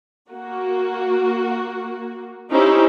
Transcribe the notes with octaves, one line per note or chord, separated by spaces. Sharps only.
A#3 F#4
C#4 D#4 E4 G4 C5